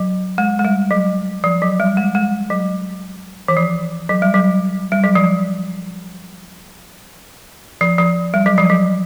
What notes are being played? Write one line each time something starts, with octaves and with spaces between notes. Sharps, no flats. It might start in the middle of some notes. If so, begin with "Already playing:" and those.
Already playing: F#3
G#3
G#3
G3
F#3
F3
F#3
G3
G#3
G#3
F#3
E3
F3
F#3
G3
F#3
G3
F#3
F3
F3
F3
G3
F#3
F3
F#3